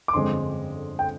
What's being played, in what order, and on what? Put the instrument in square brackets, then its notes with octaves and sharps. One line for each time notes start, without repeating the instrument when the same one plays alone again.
[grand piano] D6
[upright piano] G1 F2 D3 G#3 C4 [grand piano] C6
[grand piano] G5